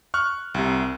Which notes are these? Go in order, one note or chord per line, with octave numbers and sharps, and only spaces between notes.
C#6 F6 F#6
C2 C3